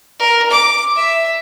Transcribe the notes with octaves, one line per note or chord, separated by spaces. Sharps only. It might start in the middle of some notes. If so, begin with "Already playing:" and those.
A#4
D6
E5